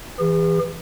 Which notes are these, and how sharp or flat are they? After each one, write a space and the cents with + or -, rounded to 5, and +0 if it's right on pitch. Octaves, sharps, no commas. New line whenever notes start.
E3 +0 G#4 -45